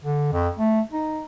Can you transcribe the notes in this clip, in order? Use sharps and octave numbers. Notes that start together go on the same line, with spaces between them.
D3
F2
A3
D#4